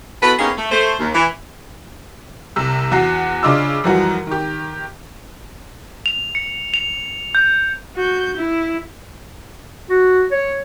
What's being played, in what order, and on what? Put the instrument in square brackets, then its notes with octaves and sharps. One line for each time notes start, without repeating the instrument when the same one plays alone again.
[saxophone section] B3 E4 F#4 A4 B4
A#3 B3 C#4 D#4 G4 G#4
A3
A3 C5
D#2
E3
[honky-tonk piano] C2 C3 E6
E2 F#4 F#5 C7
C#3 D4 F4 D#5 D6 E6
F#2 E3 F3 G3 F#4
D#3 G4
[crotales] F7
C#7
F7
G6
[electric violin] F#4 G6
E4
[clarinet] F#4
C#5